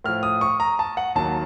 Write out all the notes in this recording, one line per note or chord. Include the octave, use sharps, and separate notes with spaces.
A2 F3 F6
D#6
C#6
A#5
A5
F#5
D#2 D#3 F#3 A5